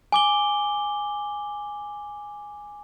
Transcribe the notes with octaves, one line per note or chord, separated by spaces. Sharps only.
G#5 D6 G7